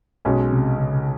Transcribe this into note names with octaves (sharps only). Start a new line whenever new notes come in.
B1 B2 G#3 C#4
C3
C#3